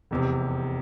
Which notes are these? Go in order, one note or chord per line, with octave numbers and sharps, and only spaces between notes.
F1 E2 C3